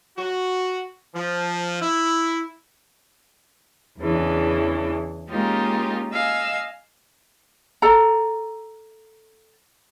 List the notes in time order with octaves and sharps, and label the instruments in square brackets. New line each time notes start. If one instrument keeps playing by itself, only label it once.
[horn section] F#4
F3
E4
[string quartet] E2 C#3 E3 D4
G#3 A#3 C#4 D#4 F4 G4
D#5 F5 G#5 E6
[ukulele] A4 A#5